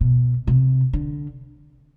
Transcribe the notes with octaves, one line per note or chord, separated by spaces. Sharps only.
B2
C3
D3